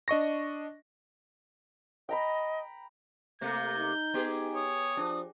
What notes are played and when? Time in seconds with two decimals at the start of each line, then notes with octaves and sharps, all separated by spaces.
0.08 D4 D#5 C#6 A#6
2.09 D#5 G5 A#5 B5
3.41 C3 A3 A#3 G6
3.78 D#4
4.14 B3 G4 G#4
4.55 C#5 D#6
4.97 F3 D4